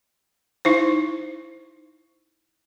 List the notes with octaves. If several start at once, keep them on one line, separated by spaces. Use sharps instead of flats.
D#4 E4 C5